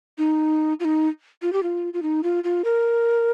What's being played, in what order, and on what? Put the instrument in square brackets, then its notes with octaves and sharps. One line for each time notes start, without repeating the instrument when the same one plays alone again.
[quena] D#4
F4
D#4
F4
G4
F4
F4
D#4
F4
F4
A#4